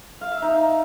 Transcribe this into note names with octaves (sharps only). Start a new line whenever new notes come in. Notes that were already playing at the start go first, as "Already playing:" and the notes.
F5
E5
D#4